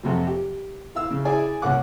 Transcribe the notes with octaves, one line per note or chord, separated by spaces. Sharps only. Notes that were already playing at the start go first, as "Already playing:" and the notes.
F2 C3 F#3
G4
E4 F5 E6
C#3
E4 G#4 D5 E5 G#5
C2 A#3 C#4 F#5 D6 F#6